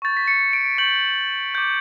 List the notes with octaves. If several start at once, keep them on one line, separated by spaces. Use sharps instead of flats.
C#6 G6 A6
B6
C#7
D7
C#6 G6 F#7
D6 G6